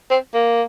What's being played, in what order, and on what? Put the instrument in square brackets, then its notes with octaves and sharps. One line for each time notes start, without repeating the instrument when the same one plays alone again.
[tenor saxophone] C4
A#3